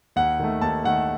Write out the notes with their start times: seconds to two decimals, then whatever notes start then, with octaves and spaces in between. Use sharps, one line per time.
0.16 D#2 F#5
0.40 D#3 A3
0.61 D#2 A5
0.84 D#3 A3 F#5